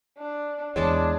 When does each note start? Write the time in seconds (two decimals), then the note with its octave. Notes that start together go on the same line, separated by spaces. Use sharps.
0.18 D4
0.76 E2 G#3 D4 C#5 A5 D6